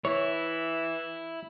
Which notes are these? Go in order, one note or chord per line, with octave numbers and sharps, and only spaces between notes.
E3 E4 C#5